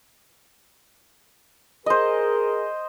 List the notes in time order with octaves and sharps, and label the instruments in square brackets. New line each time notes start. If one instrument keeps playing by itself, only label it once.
[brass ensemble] G#4 A#4 [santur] C5 D#5